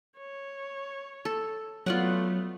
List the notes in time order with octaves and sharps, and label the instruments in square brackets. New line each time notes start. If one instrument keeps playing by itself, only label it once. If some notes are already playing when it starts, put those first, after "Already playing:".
[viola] C#5
[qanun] A4
[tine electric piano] F#3 [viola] A3 B3 [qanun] F4 D5 F#5